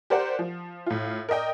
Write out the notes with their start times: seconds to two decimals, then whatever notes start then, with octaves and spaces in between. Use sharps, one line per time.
0.10 G4 A#4 C5 D5 F#5
0.39 F3
0.86 A2 F4
1.29 A#4 D5 D#5 G5